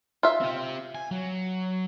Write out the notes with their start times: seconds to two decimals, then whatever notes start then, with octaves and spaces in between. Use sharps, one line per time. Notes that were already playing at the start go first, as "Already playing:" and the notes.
0.23 F4 E5
0.41 C4 G4
0.95 G#5
1.11 F#3